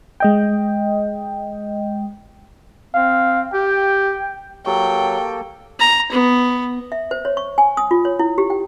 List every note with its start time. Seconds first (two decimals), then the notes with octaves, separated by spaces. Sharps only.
0.20 G#3 D#5 G5
2.94 C4 F5
3.53 G4 G5
4.66 F#3 A#3 G4 A4 G5 C#6
5.80 A#5
6.12 B3
6.92 E5
7.11 C5
7.25 C#5
7.37 C#6
7.58 G#5
7.77 D#6
7.91 F4
8.05 C#5
8.19 E4
8.38 G4
8.50 G5